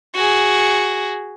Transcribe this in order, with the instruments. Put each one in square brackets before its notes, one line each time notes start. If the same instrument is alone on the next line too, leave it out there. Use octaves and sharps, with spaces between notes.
[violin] F#4 G#4